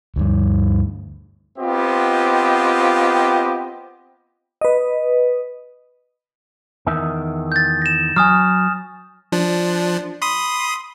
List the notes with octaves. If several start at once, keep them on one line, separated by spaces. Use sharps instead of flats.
D2 G2
B3 C4 F4 G4 D#5
B4 D#5
E2 D#3 E5
G6 A6
A#6 E7
F#3 G#5 D#6 F6
F3 D4
B5 C6 D#6